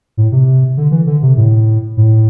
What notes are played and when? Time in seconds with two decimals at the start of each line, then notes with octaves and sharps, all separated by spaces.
0.17 A2
0.32 C3
0.77 D3
0.91 E3
1.07 D3
1.22 C3
1.37 A2
1.97 A2